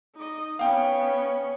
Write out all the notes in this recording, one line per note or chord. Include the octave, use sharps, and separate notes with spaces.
D#4 D#5
B3 C#4 F5 G5